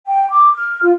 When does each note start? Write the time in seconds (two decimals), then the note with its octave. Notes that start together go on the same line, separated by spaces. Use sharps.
0.07 G5
0.29 D6
0.55 F6
0.83 F4